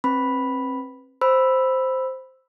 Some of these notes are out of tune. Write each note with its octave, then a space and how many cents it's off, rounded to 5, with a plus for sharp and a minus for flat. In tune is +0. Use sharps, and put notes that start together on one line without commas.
C4 +30 B4 +0 B5 +0
C5 +0 B5 +0 E6 +0